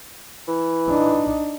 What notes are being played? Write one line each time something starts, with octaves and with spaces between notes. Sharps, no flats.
E3
D4 D#4